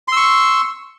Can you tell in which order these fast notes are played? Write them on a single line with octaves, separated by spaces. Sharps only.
C6 E6 C#6